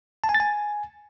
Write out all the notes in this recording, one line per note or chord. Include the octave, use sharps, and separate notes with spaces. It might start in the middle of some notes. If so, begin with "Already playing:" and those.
A5
G#5
A6
G#5